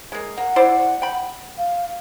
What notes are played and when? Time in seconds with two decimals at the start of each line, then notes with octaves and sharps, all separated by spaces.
0.12 G#3 A#3
0.38 A#3 F#5
0.56 E4 C5 D5
1.02 G5 B5
1.58 F5